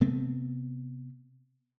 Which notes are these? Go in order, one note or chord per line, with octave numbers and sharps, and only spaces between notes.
C3 A3 B3 C4